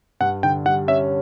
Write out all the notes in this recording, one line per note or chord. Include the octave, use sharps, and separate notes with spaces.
G2 F#5
D3 G5
G3 F#5
C#4 E5